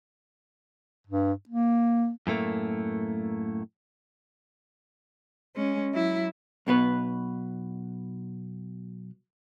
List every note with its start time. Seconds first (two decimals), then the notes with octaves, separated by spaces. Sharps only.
1.07 G2
1.49 A#3
2.27 F#2 A2 A3 A#3
5.55 G#3 C#4
5.93 F#3 E4
6.67 B1 B2 B3 B4